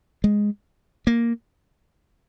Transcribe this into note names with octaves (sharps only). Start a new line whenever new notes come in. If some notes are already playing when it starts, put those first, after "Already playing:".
G#3
A#3